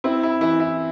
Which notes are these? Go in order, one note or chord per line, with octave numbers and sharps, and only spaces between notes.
C4 E4
E4
E3 E4
E4